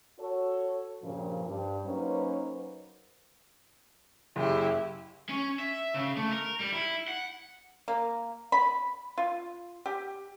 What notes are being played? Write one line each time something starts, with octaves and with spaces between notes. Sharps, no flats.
F#4 A4 C#5
G2 A#2 C#3 F3
G2
F#3 A#3 C#4 D#4 B4 C5
F#1 E4 G4
C#4
E5
C#3
A3
A#4
G3
E4
F#5
A#3
B5
F4
G4